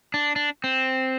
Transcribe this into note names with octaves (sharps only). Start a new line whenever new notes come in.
D4
D4
C4